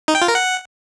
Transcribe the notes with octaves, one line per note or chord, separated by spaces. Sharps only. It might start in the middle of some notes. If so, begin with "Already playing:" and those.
D#4
G5
F4
A#4
F#5